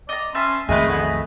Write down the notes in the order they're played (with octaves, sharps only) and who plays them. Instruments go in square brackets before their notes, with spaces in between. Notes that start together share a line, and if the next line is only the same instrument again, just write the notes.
[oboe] D5 [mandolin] D#5 A#5
[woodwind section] C#4 [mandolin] B4 E5 A5 [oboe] C6
[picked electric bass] B1 F2 D#3 [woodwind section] G#3 A3 [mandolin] G#4 B4 [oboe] D#5
[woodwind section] D3 B3 E4
A3